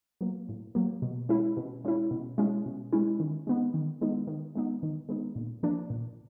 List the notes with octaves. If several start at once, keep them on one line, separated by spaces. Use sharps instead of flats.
F#3 A#3
A2
F#3 A#3
B2
G#3 C#4 E4
B2
G#3 C#4 E4
B2
G#3 C#4 E4
B2
G#3 C#4 E4
D#3
G#3 B3 D#4
D#3
G#3 B3 D#4
D#3
G#3 B3 D#4
D#3
G#3 B3 D#4
A#2
F3 A#3 D4
A#2